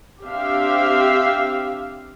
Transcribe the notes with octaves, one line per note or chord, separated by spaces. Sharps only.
C4 D4 G4 E5 F5